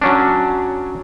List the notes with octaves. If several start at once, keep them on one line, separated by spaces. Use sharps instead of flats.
F#3 C#4 D4